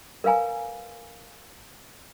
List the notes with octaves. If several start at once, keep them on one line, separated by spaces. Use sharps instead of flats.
A#4 B4 F5 G#5 A#5